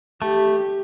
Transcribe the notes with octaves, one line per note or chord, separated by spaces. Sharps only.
A3 G4